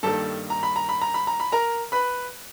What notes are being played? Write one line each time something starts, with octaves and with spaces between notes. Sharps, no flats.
G2 D#3 G3 A#3 A4 A5
A#5
B5
A#5
B5
A#5
B5
A#5
B5
A#4 A#5
B4 B5